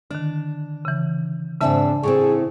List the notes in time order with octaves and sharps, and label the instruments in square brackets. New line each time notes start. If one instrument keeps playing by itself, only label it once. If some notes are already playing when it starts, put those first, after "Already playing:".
[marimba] D3 D#3 [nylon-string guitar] D4
[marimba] C#3 E3
[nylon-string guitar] G#2 C4 E5 [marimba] C#3 A5 [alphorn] D4
[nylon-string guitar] A2 A3 C4 [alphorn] G#4 [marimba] C#6